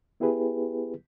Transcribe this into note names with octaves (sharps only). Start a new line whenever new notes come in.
B3 E4 G4 G#4 B4